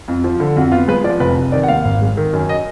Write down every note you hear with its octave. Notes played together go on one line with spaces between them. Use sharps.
F2
F3
D3
F2 F#4
B3 F4
G#3 B4
F3 D5
F1 B4
F1
D#3 D5
F#5
D#2 F5
G#1
G#3
D#3
F#2
D#5